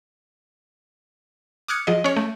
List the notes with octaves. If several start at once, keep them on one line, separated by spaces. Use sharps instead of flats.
D6 D#6 F6 F#6 G#6 C#7
F3 G#4 D#5
C#4 C#5
A3